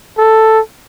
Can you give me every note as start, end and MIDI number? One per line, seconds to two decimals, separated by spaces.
0.18 0.60 69